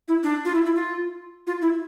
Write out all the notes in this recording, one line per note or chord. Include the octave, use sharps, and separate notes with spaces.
E4
D4
F4
E4
E4
F4
F4
E4